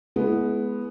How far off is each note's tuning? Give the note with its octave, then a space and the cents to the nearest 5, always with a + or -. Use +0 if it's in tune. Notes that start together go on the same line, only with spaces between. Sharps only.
G#3 +25 B3 +0 E4 +0